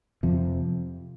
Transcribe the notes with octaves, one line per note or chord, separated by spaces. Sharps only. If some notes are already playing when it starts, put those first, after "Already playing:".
F2 C3 F3